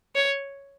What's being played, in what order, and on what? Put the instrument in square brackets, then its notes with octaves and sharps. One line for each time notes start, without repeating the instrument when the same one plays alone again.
[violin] C#5